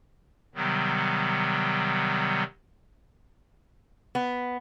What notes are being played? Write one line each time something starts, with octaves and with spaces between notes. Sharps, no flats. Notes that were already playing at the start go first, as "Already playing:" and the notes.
C3 D#3 F#3 G3 B3
B3